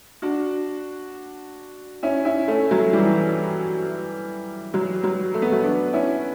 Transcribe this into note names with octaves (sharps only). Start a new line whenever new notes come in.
D4 F#4
C#4 E4
C#4 E4
A3 C#4
F#3 A3
E3 G3
F#3
F#3
A3
B3
F#3 A3
B3 D4
C#4 E4